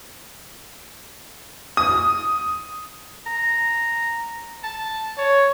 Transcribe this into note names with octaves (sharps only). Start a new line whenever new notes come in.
D#6
A#5
A5
C#5